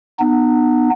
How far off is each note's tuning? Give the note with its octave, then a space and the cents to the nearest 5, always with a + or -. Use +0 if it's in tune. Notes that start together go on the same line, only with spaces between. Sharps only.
B3 +0 D#4 -35